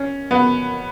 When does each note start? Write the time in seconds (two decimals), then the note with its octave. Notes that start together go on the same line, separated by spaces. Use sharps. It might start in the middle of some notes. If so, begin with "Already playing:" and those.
Already playing: C#4
0.31 B3